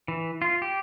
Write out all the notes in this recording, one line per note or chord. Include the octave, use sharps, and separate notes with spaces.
E3
F4
G4